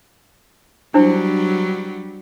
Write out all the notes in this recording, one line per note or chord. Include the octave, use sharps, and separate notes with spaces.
F#3 G3 D4 E4 C5